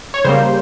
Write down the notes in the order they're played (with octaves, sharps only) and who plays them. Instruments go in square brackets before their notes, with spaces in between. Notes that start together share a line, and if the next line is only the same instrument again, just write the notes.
[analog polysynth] C#5
C#3 G3 A#3 C5